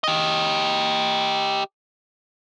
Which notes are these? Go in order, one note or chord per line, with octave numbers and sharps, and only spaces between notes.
G4 D#5